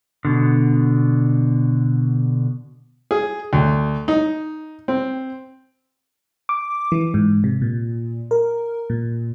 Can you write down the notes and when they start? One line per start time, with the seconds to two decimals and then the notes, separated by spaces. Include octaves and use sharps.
0.25 B2 D3
3.11 G#4
3.53 D2
4.08 D#4
4.88 C4
6.49 D6
6.92 E3
7.14 G#2
7.44 C3
7.62 A#2
8.31 A#4
8.90 A#2